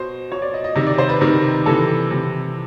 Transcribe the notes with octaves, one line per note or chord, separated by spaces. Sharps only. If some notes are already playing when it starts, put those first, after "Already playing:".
Already playing: B2 C5
B2 C#5
D5
D#5
D#5
C3 D#3 D#5
D5
C5
B4
C3 D#3 A#4
C3 E3 A4
C3 E3